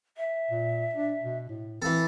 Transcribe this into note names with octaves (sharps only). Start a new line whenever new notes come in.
E5
A#2
D4
B2
A2
E3 C4 A4